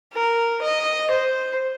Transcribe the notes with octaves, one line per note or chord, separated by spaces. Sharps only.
A#4
D#5
C5